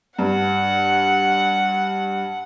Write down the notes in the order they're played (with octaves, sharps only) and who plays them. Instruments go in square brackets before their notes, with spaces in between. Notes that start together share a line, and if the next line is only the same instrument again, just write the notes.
[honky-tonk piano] G2 [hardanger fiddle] F#5